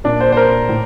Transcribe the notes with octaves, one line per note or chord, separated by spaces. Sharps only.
A#2 D4
C5
C5
A#4
A2